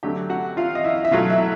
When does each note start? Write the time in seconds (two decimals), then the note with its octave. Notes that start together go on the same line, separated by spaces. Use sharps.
0.03 D3 F#3 A3 G4 G5
0.30 F#4 F#5
0.57 F4 F5
0.75 D#5
0.84 E4 E5
1.05 E5
1.11 B2 F#3 A3 F4 F5
1.30 E4 E5